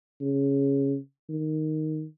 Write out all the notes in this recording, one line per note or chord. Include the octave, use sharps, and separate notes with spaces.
C#3
D#3